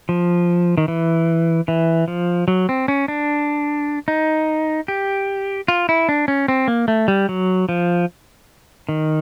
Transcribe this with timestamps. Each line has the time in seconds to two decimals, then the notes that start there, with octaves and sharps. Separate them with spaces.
0.09 F3
0.78 D#3
0.88 E3
1.68 E3
2.08 F3
2.48 F#3
2.69 C4
2.88 C#4
3.08 D4
4.08 D#4
4.88 G4
5.68 F4
5.89 E4
6.09 D4
6.28 C#4
6.48 C4
6.68 A#3
6.88 A3
7.08 G3
7.29 F#3
7.69 F3
8.89 D#3